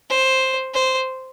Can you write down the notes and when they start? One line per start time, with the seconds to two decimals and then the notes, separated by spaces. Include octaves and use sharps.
0.10 C5
0.74 C5